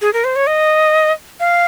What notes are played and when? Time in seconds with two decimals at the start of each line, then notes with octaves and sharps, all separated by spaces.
0.01 G#4
0.13 A#4
0.24 C5
0.36 C#5
0.47 D#5
1.40 F5